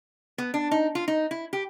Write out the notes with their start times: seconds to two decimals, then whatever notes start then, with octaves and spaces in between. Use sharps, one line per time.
0.38 B3
0.54 D4
0.71 D#4
0.95 F4
1.08 D#4
1.31 E4
1.53 G4